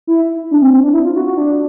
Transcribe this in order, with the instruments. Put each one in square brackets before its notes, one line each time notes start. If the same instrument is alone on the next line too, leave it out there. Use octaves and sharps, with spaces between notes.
[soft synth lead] E4
D4
C4
C4
D4
E4
F4
F#4
F#4
D4